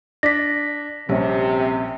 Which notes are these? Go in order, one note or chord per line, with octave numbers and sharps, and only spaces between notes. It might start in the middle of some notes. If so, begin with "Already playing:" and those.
D4 A#6 B6
A#1 C3 G3 C#4